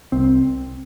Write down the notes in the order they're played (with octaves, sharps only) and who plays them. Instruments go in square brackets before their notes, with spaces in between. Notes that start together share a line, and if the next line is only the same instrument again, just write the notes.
[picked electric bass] C2 C4